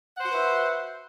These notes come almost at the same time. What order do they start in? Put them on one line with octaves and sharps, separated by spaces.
F#5 C5 F#4 B4 E5